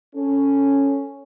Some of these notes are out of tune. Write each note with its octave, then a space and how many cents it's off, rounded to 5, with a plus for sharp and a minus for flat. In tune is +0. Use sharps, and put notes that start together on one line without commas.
C#4 +0 A4 +5